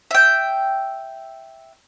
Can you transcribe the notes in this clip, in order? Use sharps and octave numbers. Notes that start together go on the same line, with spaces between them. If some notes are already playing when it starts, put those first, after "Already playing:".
E5 G5